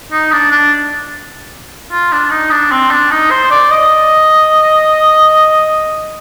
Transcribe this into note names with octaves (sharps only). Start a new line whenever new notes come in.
D#4
D4
D4
F4
D4
D#4
D4
C4
D4
D#4
C5
D5
D#5